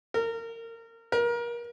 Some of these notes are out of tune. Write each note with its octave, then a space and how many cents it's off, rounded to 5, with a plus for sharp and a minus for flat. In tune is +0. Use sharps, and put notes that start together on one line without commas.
A#4 -25
A#4 +30